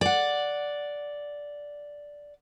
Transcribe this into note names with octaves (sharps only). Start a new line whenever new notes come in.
D5 F#5